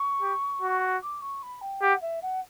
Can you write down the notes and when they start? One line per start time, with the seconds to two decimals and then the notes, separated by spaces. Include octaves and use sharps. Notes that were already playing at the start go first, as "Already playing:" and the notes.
Already playing: C#6
0.22 G4
0.62 F#4
1.02 D6
1.21 C#6
1.42 B5
1.61 G5
1.82 G4 F#5
2.01 E5
2.22 F#5